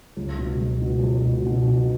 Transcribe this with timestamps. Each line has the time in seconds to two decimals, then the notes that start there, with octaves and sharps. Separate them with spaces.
0.17 C#2
0.39 B2
0.60 C#2
0.82 B2
1.03 C#2
1.24 B2
1.46 B2
1.68 B2